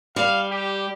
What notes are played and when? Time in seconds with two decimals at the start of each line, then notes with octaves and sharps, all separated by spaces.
0.16 G3 F5
0.51 G4